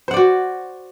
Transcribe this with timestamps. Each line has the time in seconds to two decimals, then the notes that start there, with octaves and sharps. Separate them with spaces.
0.08 C5
0.11 F#5
0.14 D5
0.17 F#4